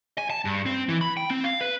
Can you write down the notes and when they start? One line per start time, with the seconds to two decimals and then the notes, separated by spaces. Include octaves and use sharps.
0.18 G#5
0.30 A5
0.45 G2
0.66 C4
0.89 E3
1.01 B5
1.17 G5
1.30 C4
1.44 F5
1.61 B4